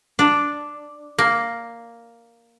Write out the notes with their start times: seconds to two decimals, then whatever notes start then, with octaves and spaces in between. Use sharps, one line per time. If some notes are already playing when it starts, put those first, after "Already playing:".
0.19 D4
1.19 A#3